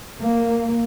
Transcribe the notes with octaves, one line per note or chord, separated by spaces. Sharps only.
A#3